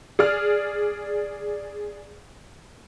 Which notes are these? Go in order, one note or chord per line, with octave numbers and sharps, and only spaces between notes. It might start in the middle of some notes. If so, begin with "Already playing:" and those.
G#4 D5 F6